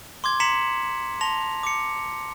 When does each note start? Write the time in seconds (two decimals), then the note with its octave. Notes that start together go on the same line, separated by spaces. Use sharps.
0.24 C6 D6 G#6
0.40 A#5 C6 B6 C#7 E7 F#7
1.21 A5 C6 A#6 F7
1.63 D6 C#7